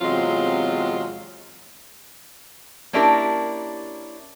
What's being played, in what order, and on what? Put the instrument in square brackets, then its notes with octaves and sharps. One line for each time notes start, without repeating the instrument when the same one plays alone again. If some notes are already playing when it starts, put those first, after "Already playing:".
[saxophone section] E2 C3 F#3 G#3 C4 F4
[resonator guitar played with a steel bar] A#3 C#4 D4 E4 G4 A#4